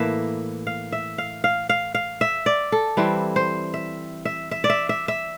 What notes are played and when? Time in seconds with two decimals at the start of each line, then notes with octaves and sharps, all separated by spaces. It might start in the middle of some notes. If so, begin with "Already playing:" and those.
Already playing: A2 E3 A#3 E5
0.67 F5
0.92 E5
1.18 F5
1.44 F5
1.69 F5
1.94 F5
2.21 E5
2.46 D5
2.72 A4
2.97 E3 G3 C4 E4
3.36 C5
3.74 E5
4.25 E5
4.51 E5
4.64 D5
4.70 E5
4.89 E5
5.08 E5